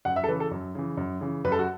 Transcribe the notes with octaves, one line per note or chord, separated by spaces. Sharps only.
F#2 F#5
E5
A4
C#3 E3 B4
A4
F#2
C#3 E3
F#2
C#3 E3
F#2 B4
A4
F#4